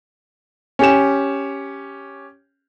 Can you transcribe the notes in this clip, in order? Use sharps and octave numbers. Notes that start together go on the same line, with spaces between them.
C#4 G4 E7